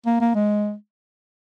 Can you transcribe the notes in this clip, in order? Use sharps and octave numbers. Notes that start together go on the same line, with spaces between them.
A#3
A#3
G#3